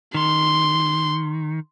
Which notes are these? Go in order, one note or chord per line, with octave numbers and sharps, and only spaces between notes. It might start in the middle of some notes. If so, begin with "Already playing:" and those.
D#3 C6